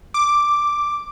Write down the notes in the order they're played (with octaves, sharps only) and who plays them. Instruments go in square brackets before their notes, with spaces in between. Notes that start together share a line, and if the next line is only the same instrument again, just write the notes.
[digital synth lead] D6